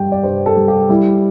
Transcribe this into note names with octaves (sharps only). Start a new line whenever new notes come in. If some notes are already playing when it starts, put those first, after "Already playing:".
Already playing: G2 G3 G5
D5
G2 C5
A4
G3
G4
G3 E4